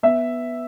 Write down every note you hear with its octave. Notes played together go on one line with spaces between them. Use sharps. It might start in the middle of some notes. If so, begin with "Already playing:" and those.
B3 E5